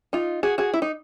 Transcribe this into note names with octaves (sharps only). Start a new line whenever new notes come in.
D#4 F4
F#4 G#4
F#4 G#4
E4
D#4